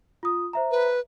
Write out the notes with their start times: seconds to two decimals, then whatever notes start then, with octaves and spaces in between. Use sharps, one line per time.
0.23 F4 D#6
0.53 C5 E5 A#5
0.71 B4